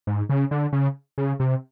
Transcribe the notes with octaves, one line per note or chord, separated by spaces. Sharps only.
G#2
C#3
D3
C#3
C#3
C3